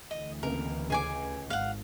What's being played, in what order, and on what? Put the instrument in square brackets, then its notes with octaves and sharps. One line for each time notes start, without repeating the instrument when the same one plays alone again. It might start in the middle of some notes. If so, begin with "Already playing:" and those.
[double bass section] D2 D3 E3 [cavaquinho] D#5
[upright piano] C#2 C3 A#3 [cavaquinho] A#4
[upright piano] C#2 C#4 [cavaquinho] G#4 G#5 D6
[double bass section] G#1 [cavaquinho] F5 F#5